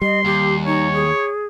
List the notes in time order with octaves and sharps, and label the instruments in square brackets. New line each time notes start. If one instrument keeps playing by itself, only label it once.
[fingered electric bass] G3 [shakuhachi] D#5 [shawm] C6
[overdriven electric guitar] D#2 [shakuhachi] G4
[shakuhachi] D#4 [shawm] C#5
[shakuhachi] G#4